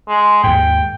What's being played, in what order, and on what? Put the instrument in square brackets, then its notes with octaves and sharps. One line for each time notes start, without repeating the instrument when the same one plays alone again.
[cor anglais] G#3
[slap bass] D#2 G#2 [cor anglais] G5